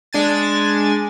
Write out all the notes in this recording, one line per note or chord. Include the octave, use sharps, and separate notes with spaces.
G#3 D4 G#5 A6